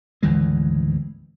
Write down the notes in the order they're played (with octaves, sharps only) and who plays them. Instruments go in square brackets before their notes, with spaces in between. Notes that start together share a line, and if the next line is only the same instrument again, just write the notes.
[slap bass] G#1 D2 E3 G#3